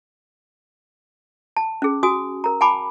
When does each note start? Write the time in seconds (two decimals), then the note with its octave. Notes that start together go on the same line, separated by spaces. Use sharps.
1.57 A5
1.82 C#4 G#4
2.03 F#4 G#5 D#6
2.44 A#4 A#5
2.61 F#5 G#5 A5 B5 D6